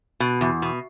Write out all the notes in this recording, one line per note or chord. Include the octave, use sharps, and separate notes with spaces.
B2
E2
B2